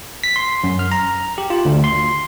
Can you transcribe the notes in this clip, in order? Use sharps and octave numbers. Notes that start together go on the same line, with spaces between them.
B6
C6
F#2
F6
A#5
G4
F4
D2
C6